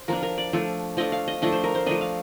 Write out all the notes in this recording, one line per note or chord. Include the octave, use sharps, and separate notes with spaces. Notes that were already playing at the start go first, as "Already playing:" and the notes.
Already playing: C5
F3 A#3 D4 A#4
A#4
D5
F3 A3 D4
F3 A3 D4 D#5
F5
D#5
F3 A3 D4 D#5
C5
A#4
C5
F3 A3 D4 D#5
F5